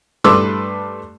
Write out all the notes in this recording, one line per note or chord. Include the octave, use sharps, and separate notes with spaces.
G2 A3 B4 C6 D6 E6